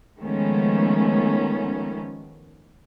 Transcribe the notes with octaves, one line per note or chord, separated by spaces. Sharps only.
D#3 F3 G#3 A3 B3 C#4